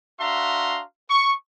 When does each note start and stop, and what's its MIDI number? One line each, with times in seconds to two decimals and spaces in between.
0.20 0.83 62
0.20 0.83 66
0.20 0.83 76
0.20 0.83 77
0.20 0.83 82
0.20 0.83 84
1.10 1.34 85